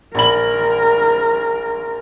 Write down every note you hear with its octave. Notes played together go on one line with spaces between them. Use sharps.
A#1 A#4 B5 F#7